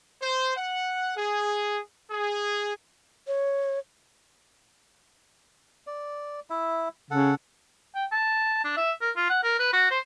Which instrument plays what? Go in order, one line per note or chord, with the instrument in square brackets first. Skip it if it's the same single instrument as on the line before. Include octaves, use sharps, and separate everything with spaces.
[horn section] C5
F#5
G#4
G#4
[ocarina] C#5
[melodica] D5
E4 E5
[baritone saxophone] C#3 [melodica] A4 F#5
[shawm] G5
A5
D4
E5
A#4
F4
F#5
A#4
B4
F#4
C5